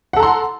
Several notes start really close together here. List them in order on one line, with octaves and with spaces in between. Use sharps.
F#5 A4 A#5 C6